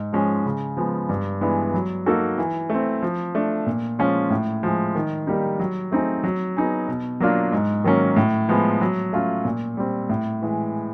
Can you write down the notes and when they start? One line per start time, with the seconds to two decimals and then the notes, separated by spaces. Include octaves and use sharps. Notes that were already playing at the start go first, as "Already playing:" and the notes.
Already playing: G#2
0.13 F3 G#3 C#4
0.46 C#3
0.77 F3 G#3 B3
1.09 G2
1.41 E3 G#3 B3 D4
1.74 F#3
2.06 A#3 D#4 F#4 A4
2.38 E3
2.70 A3 C4
3.03 F3
3.35 A3 D4
3.67 A#2
3.99 F3 G#3 C#4 F4
4.30 A2
4.63 F3 G#3
4.95 D#3
5.27 G3 A#3 D#4 G4
5.59 F#3
5.92 A3 C4 D#4 G#4
6.24 F#3
6.56 B3 D#4 G#4
6.88 B2
7.20 F#3 A#3 D4 F4
7.52 G#2
7.84 D#3 F#3 A#3 C#4
8.16 A2
8.49 F3 G#3 B3
8.81 F#3
9.13 A3 C#4 F4
9.45 A#2
9.77 G3 C4
10.09 A2
10.42 E3 G#3